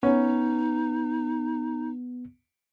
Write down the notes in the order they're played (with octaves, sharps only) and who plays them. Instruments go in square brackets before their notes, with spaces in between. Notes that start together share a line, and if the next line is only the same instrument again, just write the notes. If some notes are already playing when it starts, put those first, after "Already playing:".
[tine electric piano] B3 [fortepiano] C#4 [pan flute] D#4